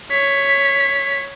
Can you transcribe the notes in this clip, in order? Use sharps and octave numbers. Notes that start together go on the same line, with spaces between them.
C#5 B6